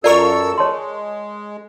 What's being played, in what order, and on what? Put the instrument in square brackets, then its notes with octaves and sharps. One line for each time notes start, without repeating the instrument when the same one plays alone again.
[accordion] F#2 A4 E6 [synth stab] F4 A#4 C#6 [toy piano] D5
[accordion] G#3 [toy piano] C#5 A5 C6